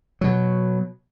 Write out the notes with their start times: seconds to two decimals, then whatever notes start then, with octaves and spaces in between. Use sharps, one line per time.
0.21 B2 F#3